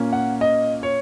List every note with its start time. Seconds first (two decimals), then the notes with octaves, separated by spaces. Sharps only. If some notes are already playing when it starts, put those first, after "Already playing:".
Already playing: A#2 A#3 C#4
0.13 F#5
0.41 D#5
0.83 C#5